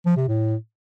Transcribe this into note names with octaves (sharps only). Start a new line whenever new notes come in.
F3
C3
A2